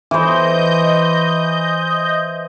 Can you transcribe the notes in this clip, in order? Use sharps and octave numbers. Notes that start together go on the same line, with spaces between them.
E3 C5 D#5 G6